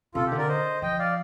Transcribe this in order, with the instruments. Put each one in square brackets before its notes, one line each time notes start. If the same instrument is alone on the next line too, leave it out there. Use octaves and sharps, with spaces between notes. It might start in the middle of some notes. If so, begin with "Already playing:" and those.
[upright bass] C3 [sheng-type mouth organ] F4 A4
[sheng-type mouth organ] G4
[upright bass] D3
[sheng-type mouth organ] A#4 D5
C5 D#5
[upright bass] F3 [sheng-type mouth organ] D#5 G5
[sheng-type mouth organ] D5 F5